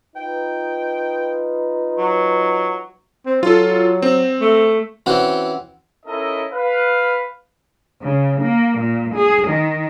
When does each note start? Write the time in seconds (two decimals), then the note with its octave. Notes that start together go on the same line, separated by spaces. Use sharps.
0.16 D#4 F4 B4 G5
1.98 F#3
3.26 C4
3.43 F#3 F4 A4
4.02 C4
4.41 A3
5.06 E3 C4 C#4 F#4
6.06 C#4 D#4 E4 A4 A#4 D#5
6.52 B4 F5
8.03 C#3
8.41 A#3
8.79 A#2
9.14 G#4
9.49 D#3